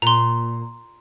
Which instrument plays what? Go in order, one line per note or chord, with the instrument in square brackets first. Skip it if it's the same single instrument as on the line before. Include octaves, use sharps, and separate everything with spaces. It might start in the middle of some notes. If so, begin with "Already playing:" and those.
[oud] A#2 [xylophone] A#5 C6